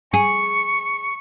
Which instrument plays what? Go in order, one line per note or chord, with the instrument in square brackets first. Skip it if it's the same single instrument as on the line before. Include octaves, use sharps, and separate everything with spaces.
[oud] G#4 [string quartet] C#6